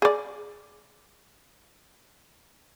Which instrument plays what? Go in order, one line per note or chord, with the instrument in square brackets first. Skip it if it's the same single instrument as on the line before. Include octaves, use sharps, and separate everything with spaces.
[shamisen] G#4 D5